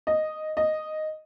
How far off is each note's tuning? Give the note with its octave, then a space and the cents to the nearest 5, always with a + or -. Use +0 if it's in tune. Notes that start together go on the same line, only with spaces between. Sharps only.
D#5 -5
D#5 -5